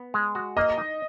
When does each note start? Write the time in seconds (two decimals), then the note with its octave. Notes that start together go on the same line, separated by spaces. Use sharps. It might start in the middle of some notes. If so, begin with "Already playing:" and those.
Already playing: B3
0.14 G#3
0.35 F#4
0.57 A#3 D#5
0.78 D#4